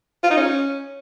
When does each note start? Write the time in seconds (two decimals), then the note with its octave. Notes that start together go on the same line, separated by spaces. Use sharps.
0.23 F4
0.30 D#4
0.37 C#4